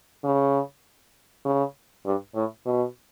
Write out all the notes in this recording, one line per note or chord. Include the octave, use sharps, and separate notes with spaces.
C#3
C#3
G2
A2
B2